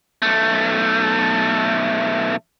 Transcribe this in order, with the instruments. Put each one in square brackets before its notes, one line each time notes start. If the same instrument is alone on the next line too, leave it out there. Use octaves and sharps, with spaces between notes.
[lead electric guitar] B1 A3